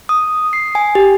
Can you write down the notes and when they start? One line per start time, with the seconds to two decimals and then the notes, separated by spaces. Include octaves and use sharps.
0.09 D#6
0.53 C7
0.75 G#5
0.95 G4